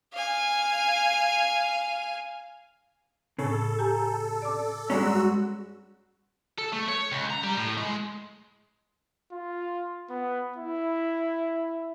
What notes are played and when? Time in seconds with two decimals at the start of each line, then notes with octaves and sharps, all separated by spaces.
0.14 F5 G#5
3.39 A2 C#3 A4
3.79 G4 G#5 A#5
4.42 D5 D6
4.90 G2 G#3 C#4 F#4 D5 A#5 E6
6.58 A4
6.73 A3
6.88 C#5
7.12 C#2
7.30 A#5
7.44 G3
7.57 A2
7.77 G#3
9.32 F4
10.10 B3
10.56 E4